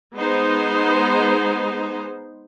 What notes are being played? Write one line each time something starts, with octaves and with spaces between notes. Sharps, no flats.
G#3 B3 D#4 C5